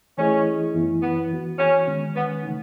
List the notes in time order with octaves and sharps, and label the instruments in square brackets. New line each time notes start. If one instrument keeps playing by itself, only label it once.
[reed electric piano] E3 A3 E4 G#4 D#5 [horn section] C#4
[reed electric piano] F#2 E3 B3 E4
[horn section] B3
[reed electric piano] E3 B3 F#4
[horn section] C#4
[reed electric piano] D#3 G#3 C#4
[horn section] B3
[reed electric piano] C#3 E3 A3 D#4